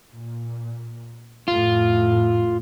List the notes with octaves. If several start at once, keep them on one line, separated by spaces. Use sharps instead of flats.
A#2
F2 A2 F4